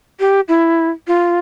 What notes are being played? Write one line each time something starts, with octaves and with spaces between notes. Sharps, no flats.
G4
E4
F4